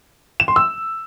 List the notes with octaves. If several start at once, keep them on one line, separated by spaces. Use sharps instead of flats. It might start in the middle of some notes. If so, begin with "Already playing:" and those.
E7
C6
E6